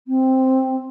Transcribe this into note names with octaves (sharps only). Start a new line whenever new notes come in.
C4